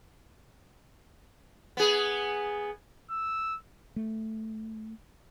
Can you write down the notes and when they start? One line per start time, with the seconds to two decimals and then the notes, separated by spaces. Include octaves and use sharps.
1.77 B3 G#4
3.11 E6
3.96 A3